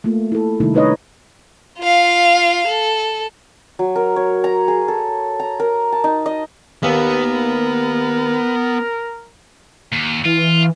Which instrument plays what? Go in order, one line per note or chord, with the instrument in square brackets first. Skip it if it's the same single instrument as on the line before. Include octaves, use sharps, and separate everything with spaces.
[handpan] A3 A#3 F4
E4 A4
C3 D#3 G3 A3 D#4 E4
D4 D#4 B4 C#5 D#5
[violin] F4 F5
A4
[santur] F#3
A#4
C#5
A#5
G#4
A4
A#5
A#4
A5
D#4
D#5
[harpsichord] D#2 [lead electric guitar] B3 [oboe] A#4
[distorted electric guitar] D#2
[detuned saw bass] E3 [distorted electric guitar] F4